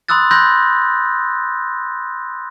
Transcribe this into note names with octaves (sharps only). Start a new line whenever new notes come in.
B5 C6 D#6 E6 F#6 A6
B5 C6 E6 F#6 G6 A#6